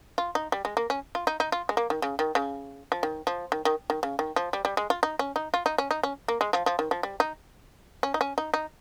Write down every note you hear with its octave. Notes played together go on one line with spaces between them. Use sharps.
F4
D#4
G3
G#3
A#3
C#4
F4
D#4
D#4
F4
G#3
A#3
D#3
C#3
D#3
C#3
F3
D#3
F3
D#3
D#3
D#3
C#3
D#3
F3
G3
G3
G#3
F4
D#4
C#4
D#4
F4
D#4
C#4
D#4
C#4
A#3
G#3
F3
F3
D#3
F3
G3
D#4
C#4
D#4
C#4
D#4
D#4